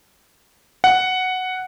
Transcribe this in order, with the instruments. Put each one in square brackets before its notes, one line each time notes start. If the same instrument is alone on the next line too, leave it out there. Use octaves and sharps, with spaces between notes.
[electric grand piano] F#5